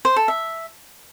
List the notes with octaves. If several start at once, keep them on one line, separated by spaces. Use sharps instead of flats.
C5
A4
E5